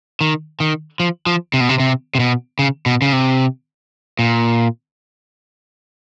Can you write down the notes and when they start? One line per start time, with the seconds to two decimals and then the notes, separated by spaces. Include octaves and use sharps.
0.21 D#3
0.60 D#3
1.00 F3
1.26 F3
1.54 C3
1.61 B2
1.69 C3
1.80 C3
2.15 C3
2.20 B2
2.59 C#3
2.86 B2
3.02 C#3
3.13 C3
4.19 A#2